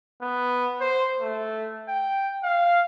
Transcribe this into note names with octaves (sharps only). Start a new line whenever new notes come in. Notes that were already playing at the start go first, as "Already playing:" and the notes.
B3
C5
A3
G5
F5